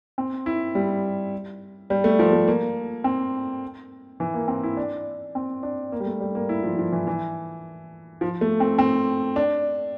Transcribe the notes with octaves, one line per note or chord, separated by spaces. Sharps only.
C4
E4
G3
G3
A3
F3
A3
A#3
C4
E3
A#3
C4
E4
D4
C4
D4
A#3
G3
A3
G3
A#3
E4
F3
F3
E3
E3
F3
A3
C4
C4
D4